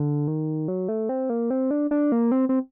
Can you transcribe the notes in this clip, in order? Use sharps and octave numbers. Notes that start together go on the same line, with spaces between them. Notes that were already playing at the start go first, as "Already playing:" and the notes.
Already playing: D3
D#3
F#3
A3
C4
A#3
C4
D4
D4
A#3
C4
C4